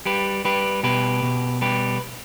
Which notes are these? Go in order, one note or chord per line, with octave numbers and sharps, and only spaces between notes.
G3 G4 B4
G3 G4 B4
B2 G4 B4
B2
G3 G4 B4